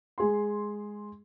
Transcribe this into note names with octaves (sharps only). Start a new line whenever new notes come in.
G#3 G#4 C6